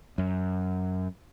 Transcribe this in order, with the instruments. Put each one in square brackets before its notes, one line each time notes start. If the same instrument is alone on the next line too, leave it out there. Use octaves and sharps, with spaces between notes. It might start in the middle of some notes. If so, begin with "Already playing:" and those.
[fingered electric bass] F#2